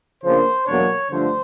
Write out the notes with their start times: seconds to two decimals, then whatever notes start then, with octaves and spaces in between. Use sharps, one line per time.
0.23 C#3 F3 A#3 D4 C5
0.67 E2 B2 F#3 A#3 D4 C#5
1.10 G2 D3 F3 A3 C5